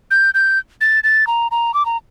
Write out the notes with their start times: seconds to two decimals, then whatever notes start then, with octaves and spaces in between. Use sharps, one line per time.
0.11 G6
0.34 G6
0.81 A6
1.04 A6
1.27 A#5
1.51 A#5
1.74 D6
1.86 A#5